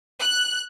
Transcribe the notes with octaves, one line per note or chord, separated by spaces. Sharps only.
F#6